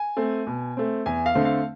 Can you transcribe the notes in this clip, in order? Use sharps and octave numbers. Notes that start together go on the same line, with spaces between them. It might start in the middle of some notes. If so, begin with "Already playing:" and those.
Already playing: G#5
A3 C4
B2
A3 C4
E2 G#5
F5
D3 A3 C4
F5